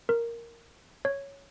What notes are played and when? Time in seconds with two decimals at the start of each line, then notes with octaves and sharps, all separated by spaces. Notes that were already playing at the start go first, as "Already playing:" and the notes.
0.09 A#4
1.05 C#5